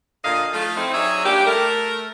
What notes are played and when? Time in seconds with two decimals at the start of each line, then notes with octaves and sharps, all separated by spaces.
0.24 A#2 D3 D#5 F5
0.53 F3 A3 D#4 F4 F5
0.77 C4 D#4 E4
0.94 F#3 D#4 G#4 C#5 D5 E5
1.26 G3 A#3 D4 G4
1.47 A3 A#4